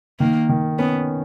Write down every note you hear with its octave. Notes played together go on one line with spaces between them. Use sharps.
D#3 A#3
D#3
B3 C#4